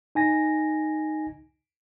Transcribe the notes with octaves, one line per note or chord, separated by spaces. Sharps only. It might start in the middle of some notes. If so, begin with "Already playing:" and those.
D#4 G#5 A#6